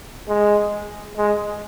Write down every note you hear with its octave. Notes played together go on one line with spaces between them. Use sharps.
G#3
G#3